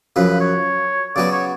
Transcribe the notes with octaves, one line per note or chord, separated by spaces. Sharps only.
F#2 C#3 F3 B4
C#5
C#3 F#3 B3 F#4 D5
C#5